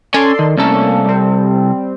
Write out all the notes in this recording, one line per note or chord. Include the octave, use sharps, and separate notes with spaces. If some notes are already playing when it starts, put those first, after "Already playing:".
C#4 A4 D5 G#5 C6
D#3
C2 A3 A#3 C#4 A4
G3 C4